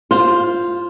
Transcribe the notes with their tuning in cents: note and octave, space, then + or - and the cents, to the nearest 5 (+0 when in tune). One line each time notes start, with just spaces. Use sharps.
F4 +0 C5 +0 F5 +25